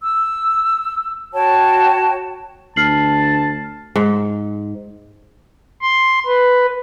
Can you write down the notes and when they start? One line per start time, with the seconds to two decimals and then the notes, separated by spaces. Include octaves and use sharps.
0.01 E6
1.32 F#4 C#5 G5 A5
2.76 D2 A5 F6 C7 F#7
3.96 G#2
5.82 C6
6.26 B4